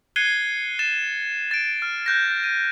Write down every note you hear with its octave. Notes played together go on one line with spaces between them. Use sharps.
F#6 G#6 C7 C#7 D#7 G7
A6 E7
A6 D7
F6
F#6 G6 A#6
D#7